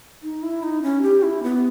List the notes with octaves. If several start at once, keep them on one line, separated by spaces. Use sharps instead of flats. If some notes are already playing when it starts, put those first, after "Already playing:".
D#4
E4
D#4
C#4
G4
E4
B3